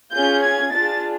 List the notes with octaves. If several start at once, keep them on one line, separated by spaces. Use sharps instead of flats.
C#4 F4 G#4 G6
G#6
D4 F4 G#4 A6